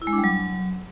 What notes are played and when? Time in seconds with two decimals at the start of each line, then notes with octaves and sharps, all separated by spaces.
0.02 E4
0.07 G#3
0.13 D4
0.18 G3
0.24 F#3